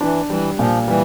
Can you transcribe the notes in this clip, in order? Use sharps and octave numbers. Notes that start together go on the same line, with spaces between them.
E3 D4
E3 G3
A#2 F3
E3 G3